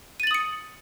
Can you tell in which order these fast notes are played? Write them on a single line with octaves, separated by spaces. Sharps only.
D#7 A6 F#7 D#6 C#7